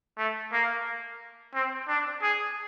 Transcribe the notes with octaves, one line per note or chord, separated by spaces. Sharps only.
A3
A#3
C4
D4
G#4